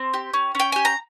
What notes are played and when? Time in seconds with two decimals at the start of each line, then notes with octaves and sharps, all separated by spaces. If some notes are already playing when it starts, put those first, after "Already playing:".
Already playing: C4
0.14 G4
0.34 C#4
0.55 C#4 G5
0.72 G4 G#5
0.85 A#5